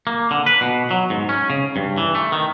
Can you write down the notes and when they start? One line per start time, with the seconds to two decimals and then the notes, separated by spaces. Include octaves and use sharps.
0.07 A#3
0.31 D3
0.46 B4
0.61 B2
0.91 F#3
1.10 G#2
1.29 C#4
1.50 C#3
1.76 G2
1.98 E3
2.15 A3
2.32 D#3